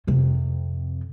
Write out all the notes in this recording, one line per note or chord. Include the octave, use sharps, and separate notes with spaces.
F2 C3